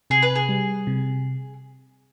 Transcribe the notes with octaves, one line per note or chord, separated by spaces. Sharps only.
C3 G#4
B4
G#4
G3
C3